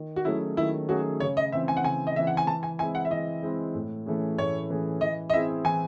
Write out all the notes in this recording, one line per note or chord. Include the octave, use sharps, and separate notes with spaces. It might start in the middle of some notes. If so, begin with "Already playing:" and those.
Already playing: D#3
F#4
F#3 A3 C#4 E4 G#4
D#3 E4
F#3 A3 C#4 F#4 G#4
C#3 C#5
D#5
E3 C4 E5
G#5
F#5
C#3 G#5
D#5
E3 C4 E5
F#5
G#5
E3 A5
G#5
G#3 C4 E4 G#5
F#5
E5
E3 D#5
G#3 C4 E4
A2
E3 A3 C#4 G#4
A2 C#5
E3 A3 C#4 G#4
E3 D#5
D#5
C4 E4 G#4 E5
E3 G#5